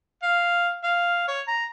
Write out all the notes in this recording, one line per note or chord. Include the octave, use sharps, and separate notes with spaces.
F5
F5
C#5
A#5